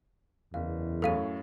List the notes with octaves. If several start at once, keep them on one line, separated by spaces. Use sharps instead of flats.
F#1 E2 F5
F#2 A2 C#4 A4 F5 D#7